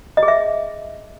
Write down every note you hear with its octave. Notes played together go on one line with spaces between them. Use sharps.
D#5
G#4
E5